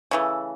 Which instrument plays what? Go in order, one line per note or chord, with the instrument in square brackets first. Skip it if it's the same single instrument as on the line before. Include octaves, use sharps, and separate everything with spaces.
[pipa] C#3 E3 A3